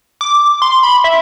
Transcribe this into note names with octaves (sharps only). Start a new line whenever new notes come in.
D6
C6
B5
E5